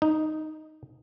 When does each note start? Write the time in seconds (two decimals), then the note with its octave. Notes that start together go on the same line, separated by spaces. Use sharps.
0.02 D#4